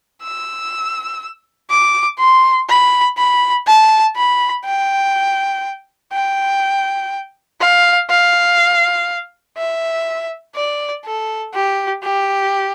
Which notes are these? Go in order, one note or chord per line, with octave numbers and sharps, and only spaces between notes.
E6
D6
C6
B5
B5
A5
B5
G5
G5
F5
F5
E5
D5
A4
G4
G4